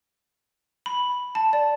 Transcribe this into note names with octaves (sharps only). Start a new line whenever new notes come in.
B5
A5
D5